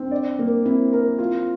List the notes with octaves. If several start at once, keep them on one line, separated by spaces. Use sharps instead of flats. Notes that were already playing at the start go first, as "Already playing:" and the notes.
Already playing: C4 D4
D5
A#3
C4 E4
A#4
F4